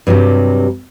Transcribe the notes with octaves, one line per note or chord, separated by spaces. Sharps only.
G2 C3 F#3 G3